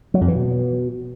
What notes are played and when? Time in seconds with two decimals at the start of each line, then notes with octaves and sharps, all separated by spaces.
0.14 F#3
0.21 F2
0.28 E3
0.35 B2